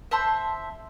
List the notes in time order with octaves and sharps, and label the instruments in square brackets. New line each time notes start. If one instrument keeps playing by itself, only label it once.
[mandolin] C5 E5 A5 C6